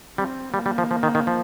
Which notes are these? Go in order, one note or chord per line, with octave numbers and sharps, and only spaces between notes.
G3 C4
G3 A#3
G3
F3
F3
D#3
D#3
F3